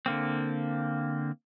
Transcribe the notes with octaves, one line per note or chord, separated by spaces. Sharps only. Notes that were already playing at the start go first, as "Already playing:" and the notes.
D3 A#3 C4